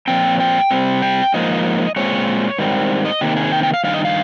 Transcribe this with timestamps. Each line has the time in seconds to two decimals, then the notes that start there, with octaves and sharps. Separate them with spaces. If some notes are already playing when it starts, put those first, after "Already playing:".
0.08 A#2 F3 C4 G5
0.40 G5
0.71 C3 G3 C4
1.02 G5
1.34 G#2 F3 A#3 D#5
1.96 A#2 G#3 C4 C#5
2.58 G#2 D#3 G3 C4
3.05 D#5
3.21 C3 D#3 A#3 G4
3.37 G#4
3.52 G5
3.63 G5
3.74 F5
3.84 G2 D#3 F5
3.94 D#5
4.05 F5